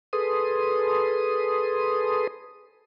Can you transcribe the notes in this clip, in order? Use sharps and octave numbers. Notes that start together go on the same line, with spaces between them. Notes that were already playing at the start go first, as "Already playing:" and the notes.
G#4 A4 B4 C6 D#6